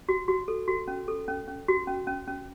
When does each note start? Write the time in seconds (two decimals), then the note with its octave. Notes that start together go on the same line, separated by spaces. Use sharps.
0.09 F#4
0.28 F#4
0.48 A4
0.68 F#4
0.88 C#4
1.08 A4
1.28 C#4
1.48 C#4
1.68 F#4
1.87 C#4
2.07 C#4
2.28 C#4